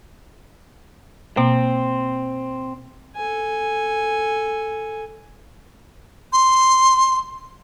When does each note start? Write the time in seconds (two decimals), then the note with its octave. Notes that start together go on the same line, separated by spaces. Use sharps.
1.37 B2 A#3 C4
3.16 A4 G#5
6.33 C6